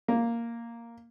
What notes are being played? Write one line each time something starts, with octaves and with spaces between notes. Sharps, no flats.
A#3